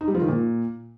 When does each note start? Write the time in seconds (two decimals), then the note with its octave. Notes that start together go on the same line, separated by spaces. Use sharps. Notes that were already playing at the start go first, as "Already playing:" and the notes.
0.01 D#4
0.08 G3
0.15 F3
0.21 D#3
0.28 A#2